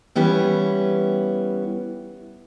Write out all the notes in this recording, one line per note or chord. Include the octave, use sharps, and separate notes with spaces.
E3 G3 B3 C#4 E4